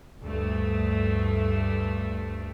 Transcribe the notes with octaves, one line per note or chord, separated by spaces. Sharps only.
D2 G2 A3